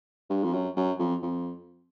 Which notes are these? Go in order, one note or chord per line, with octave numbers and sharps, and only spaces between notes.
G2
F2
F#2
F#2
F2
F2